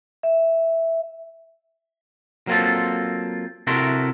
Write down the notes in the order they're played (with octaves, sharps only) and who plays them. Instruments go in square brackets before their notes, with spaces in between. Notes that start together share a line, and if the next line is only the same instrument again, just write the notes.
[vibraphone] E5
[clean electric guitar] F#3 A#3 C4 F4 A4
C3 E4 F#4 A4 A#4 C6